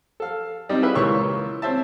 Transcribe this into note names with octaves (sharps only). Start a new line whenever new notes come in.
A4 F5
G3 C4 D#4 D5
E4 F4 G4 G#4 B4 E5
C#2 E3 A#3 C#5 C#6 E6
C4 C#4 C5 E5 A5